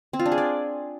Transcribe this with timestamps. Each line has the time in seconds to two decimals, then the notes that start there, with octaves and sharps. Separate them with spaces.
0.13 C4
0.19 F4
0.26 D4
0.32 G#4
0.38 D5